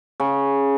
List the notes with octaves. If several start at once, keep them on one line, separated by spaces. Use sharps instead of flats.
C#3